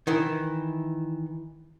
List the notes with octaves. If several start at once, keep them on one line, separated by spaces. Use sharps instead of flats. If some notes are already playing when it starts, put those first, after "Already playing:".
D#3 E3 E4